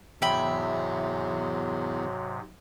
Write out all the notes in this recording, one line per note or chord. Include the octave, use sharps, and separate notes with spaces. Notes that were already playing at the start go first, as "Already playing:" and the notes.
E2 G#2 C3 F#3 E5 G5 B5